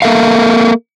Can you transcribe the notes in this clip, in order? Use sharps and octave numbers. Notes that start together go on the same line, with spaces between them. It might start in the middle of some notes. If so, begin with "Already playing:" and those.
A#3 A4 A#4 E5 F5